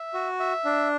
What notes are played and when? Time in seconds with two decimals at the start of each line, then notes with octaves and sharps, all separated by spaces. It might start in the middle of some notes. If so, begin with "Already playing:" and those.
Already playing: E5
0.14 F#4
0.40 E5
0.65 D4